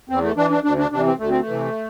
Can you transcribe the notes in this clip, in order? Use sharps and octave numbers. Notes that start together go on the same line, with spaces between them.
E2 C4
A3
E3 D4
D4
D2 D4
D4
C3 E3 D4
C4
D2 A3
C4
A3
C3 E3